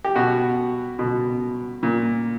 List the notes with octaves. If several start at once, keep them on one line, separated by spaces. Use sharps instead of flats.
G4
B2 F#4
B2
A#2